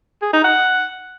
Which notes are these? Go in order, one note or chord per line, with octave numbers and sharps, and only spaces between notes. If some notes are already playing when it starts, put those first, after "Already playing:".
G#4
D#4
F#5